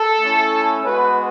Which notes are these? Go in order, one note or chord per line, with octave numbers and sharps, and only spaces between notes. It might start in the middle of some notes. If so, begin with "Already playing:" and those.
Already playing: A4
A3 C#4 E4
G#3 B3 F#4 B4